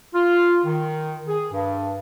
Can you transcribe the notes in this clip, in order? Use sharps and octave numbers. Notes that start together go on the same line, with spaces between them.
F4
D#3
G#4
G2